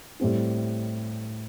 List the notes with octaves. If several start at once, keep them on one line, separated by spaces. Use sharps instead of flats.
A2 G3 C4 E4